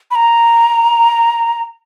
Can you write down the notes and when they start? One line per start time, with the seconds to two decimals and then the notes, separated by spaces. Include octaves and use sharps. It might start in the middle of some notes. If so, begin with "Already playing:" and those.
0.11 B5
0.15 A#5